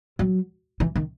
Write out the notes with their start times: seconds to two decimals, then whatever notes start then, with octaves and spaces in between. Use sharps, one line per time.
0.19 F#3
0.80 E3
0.96 D#3